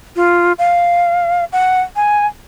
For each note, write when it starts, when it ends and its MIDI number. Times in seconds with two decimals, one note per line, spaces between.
0.16 0.53 65
0.59 1.45 77
1.53 1.81 78
1.96 2.26 80